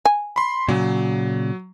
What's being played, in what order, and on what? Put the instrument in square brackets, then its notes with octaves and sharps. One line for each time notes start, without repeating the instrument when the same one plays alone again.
[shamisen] G#5
[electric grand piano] B5 C6
[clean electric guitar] A#2 C#3 [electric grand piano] F#3